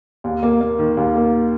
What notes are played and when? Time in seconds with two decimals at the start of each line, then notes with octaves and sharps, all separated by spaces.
0.24 D#2
0.43 A#3
0.61 A#3
0.79 D#3
0.97 D#2
1.15 A#3